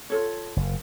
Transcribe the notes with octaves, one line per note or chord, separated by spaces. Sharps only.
F4 A4 C#5
F#1